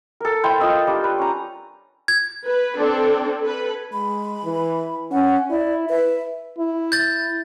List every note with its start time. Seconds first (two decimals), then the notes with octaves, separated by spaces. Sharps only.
0.20 A4 A#4
0.44 E4 C5 G5 C6
0.60 F4 D#5 E6
0.87 G3 D4
1.04 B4
1.19 C#4 A#5
2.08 G#6
2.45 B4
2.77 C4 D4 A4
3.43 A4 B4
3.93 G#3 B5
4.44 E3
5.11 C#4 F#5
5.50 E4 D5
5.89 B4 E5
6.59 E4
6.92 G6 A6